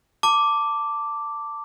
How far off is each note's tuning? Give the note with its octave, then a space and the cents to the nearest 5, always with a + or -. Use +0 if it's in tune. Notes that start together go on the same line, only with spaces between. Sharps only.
A5 +25 D6 -5